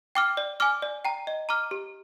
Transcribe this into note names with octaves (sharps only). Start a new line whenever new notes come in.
G5 D6 F6
D5
G#5 D6 F6
D5
G5 A#5
D#5
A#5 D6 F6
G4